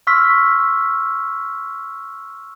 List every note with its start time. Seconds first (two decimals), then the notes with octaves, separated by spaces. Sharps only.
0.07 C6 C#6 E6 F6 B6